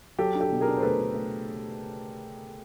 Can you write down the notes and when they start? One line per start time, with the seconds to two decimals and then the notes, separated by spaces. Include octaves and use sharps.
0.19 F#3 G4 A4
0.35 D4
0.41 G4 A4
0.52 B2
0.61 G#4 A#4
0.68 D4
0.77 C5
0.82 A3 A4 B4
0.99 D4
1.15 A3